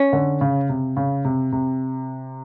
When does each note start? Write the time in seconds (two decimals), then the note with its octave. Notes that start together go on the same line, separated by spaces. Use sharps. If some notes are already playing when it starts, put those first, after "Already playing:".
Already playing: C#4
0.13 D3
0.41 C#3
0.69 C3
0.97 C#3
1.25 C3
1.52 C3